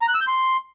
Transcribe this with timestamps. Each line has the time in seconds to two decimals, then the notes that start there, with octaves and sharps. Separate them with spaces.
0.02 A#5
0.08 F#6
0.14 E6
0.21 G6
0.27 C6